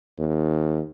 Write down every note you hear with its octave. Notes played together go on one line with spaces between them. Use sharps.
D#2